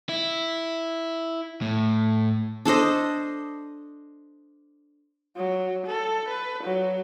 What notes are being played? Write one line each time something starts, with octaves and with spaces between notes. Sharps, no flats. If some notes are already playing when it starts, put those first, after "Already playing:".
E4
A2
D4 A4 C5 D#5
F#3
A4
B4
F#3